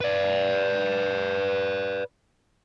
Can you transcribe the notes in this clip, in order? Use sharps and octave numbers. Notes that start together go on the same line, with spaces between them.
B4 D5